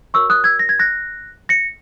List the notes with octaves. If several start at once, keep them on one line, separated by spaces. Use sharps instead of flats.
F#4 A#4 C#5 C#6 E6
D#6 F#6
E6 G#6
A#6
G#6
F#6 A#6
A#6 C#7